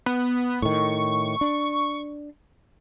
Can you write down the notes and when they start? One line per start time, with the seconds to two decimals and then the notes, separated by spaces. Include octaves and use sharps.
0.06 B3
0.62 A2 D#3 C#6
1.41 D4